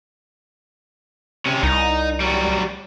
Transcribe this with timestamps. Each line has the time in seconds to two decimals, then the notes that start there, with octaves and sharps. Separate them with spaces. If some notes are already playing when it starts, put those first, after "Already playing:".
1.46 C3 C#4
1.63 C2 D#4
2.20 F#3 G3